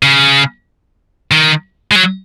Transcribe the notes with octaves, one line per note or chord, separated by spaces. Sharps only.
C#3
D#3
G#3
F#3